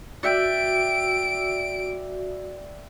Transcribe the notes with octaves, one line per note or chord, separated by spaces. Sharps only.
F#4 D5 E5 G5 D7